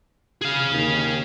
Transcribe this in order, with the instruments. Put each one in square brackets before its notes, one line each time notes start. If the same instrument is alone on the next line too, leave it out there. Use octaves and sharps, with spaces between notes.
[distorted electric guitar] G#4 F5
[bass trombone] D#2